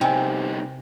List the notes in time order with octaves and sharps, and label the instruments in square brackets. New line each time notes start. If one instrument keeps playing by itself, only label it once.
[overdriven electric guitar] C2 D#4 [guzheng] C3 [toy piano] G5 G#5